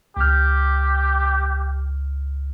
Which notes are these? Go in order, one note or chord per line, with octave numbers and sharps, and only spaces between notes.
C#2 G4 F6